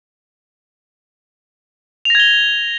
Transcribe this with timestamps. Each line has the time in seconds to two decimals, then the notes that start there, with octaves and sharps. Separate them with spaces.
2.05 F7
2.10 A#6
2.15 G#6
2.20 G7